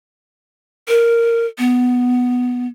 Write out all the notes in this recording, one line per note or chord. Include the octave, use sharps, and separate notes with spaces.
A#4
B3